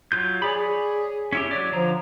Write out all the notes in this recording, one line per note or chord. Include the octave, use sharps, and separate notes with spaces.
F#3 F4 G6
G#4 C#5 D5 B5
C#4 E4 G4
F#3 C#5 D5
D3 F3 A#5